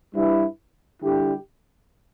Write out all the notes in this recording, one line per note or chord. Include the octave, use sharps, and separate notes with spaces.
G2 G3 E4 B4
D3 G3 E4 G4